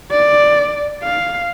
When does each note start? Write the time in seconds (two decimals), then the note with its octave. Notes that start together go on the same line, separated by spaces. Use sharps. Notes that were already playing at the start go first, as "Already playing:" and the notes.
0.11 D5
1.03 F5